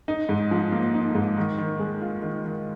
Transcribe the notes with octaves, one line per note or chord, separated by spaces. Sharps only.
D#4
G#2
F3
A#3
D#4
G#2
D#3
D#3
G#3
F4
D#3
D#3